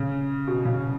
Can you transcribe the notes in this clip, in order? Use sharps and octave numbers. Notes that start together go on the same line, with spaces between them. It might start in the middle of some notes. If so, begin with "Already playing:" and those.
Already playing: C#3
B2
C#3